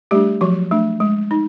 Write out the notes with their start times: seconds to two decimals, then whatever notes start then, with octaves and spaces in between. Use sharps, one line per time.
0.11 G3 A3 D4 G4
0.41 F3 F#3 F#4
0.71 A3 D4
1.00 G#3
1.31 D#4